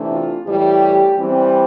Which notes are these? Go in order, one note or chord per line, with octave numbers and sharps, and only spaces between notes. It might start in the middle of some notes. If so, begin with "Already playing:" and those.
Already playing: C3 E3 A3 D4
F4
A2 E3 G3 G4
E3 G3 C4